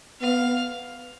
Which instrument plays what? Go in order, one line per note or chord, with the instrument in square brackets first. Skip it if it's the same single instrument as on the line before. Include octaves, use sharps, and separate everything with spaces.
[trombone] B3 [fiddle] F5